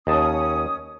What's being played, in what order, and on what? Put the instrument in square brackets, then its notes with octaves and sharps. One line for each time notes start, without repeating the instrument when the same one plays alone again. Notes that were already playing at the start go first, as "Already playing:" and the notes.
[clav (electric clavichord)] D#2 A5 [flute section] C#4 D#6